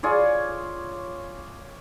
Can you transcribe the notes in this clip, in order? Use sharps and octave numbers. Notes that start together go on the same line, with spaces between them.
F4 G#4 C#5 D5